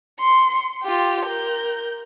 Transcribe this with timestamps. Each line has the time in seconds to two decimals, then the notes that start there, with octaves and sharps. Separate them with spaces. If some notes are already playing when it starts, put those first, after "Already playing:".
0.20 C6 C#7
0.83 F4 G4
1.26 A#4 G6